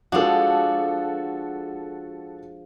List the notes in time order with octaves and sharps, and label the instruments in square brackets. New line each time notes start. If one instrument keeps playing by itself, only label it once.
[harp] F3 [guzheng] G#3 D4 [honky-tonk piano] F#4 A4